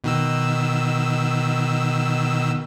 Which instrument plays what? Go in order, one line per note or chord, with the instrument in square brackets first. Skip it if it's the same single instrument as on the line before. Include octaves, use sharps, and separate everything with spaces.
[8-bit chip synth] B2 D#3 E6